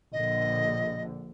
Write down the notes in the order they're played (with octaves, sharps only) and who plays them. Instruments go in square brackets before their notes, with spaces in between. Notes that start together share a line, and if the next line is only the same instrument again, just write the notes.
[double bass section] A#1 D3 [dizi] D#5